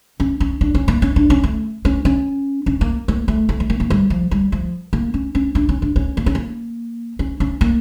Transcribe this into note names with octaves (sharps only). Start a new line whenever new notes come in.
C#4
C#4
D4
C#4
A#3
C#4
D4
C#4
A3
C#4
C#4
C#4
A#3
A#3
A3
A3
A3
A#3
A#3
G3
F3
G3
F3
A#3
C#4
C#4
D4
C#4
D4
C#4
A#3
C#4
A#3
C#4
C#4
A#3